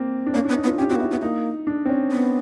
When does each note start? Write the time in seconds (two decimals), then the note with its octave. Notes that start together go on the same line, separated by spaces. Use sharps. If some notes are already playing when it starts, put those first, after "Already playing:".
Already playing: A#3 C4
0.26 D4
0.34 A#3 C#4
0.45 B3 D4
0.56 D#4
0.64 B3
0.67 F4
0.78 C#4 G4
0.89 C4 F#4
0.96 A#3
1.00 B3 E4
1.11 B3 E4
1.22 A#3 D#4
1.67 D4
1.86 C4
1.89 C#4
2.12 B3